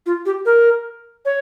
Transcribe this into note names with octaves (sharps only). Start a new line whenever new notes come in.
F4
G4
A#4
C#5